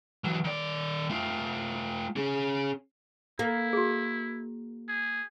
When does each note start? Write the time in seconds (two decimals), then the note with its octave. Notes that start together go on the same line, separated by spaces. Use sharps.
0.24 E3 F#3
0.45 D#3 D5
1.10 A3 F4
2.16 C#4 G#4
3.39 A#3 E4
3.73 F#4 G#4
4.88 G#4